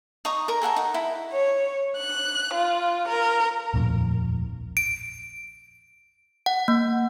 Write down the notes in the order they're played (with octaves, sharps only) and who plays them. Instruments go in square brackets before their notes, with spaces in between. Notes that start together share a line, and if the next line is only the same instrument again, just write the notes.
[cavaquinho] D#4 A#5 C#6 D#6
A#4 A#5
G#4 A4 F#5 A#5
D#4 F#5
E4
[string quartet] C#5
F#6
F4
A#4
[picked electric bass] D#1 A#1 F2 A2
[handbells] D7
F#5
A#3